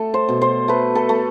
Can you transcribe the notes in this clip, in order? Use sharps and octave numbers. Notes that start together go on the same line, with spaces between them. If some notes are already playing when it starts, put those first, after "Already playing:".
Already playing: A3 A4
C5
B2
C5
A3 B4
A4
A3